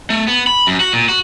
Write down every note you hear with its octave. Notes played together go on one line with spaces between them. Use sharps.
A3
B3
B5
F#2
F#4
A#2
F#4